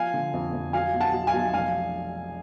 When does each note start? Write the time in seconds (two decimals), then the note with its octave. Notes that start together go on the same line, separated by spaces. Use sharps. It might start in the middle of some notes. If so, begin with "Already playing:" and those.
Already playing: F3 F5 G#5
0.14 D3
0.34 F2
0.53 F2
0.73 F#3 F5 G#5
0.94 B1
1.00 F#5 A5
1.13 B1
1.27 F5 G#5
1.33 B1
1.54 F1 F5 G#5